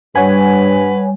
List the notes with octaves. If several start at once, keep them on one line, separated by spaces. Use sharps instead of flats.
G2 G3 B4 C#5 F#5 G#5